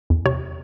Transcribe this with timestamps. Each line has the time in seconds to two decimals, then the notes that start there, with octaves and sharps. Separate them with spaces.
0.10 E2
0.26 C3 C#5